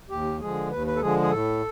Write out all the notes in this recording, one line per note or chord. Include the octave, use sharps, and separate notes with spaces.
D#2 G4
D3 F3 G#3 G#4
D#2 B4
B4
A4
D3 F3 G#3 G#4
G#4
A2 A4